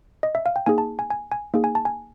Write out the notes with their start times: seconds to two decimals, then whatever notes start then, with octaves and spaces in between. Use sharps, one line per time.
0.23 D#5
0.35 E5
0.46 F5
0.56 G5
0.66 A#3 D#4 G#4 G#5
0.78 A5
0.99 G#5
1.10 G#5
1.32 G#5
1.54 A#3 D#4 G#4
1.64 G#5
1.75 A5
1.85 G#5